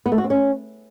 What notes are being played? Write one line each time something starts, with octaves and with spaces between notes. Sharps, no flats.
B3
A3
F#4
C4
C#4